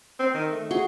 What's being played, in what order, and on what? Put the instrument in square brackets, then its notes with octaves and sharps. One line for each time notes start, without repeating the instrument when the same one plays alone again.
[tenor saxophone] C4
D#3
A3
[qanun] F#4 G#4 C6